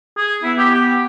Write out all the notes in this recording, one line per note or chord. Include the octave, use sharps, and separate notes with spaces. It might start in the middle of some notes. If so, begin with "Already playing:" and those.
G#4
B3 E4
G4
G4